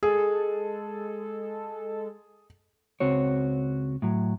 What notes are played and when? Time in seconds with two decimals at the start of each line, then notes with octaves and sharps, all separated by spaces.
0.03 G#3 G#4 A4
3.00 C#2 C4 F#4 C#5
4.02 A2 F#3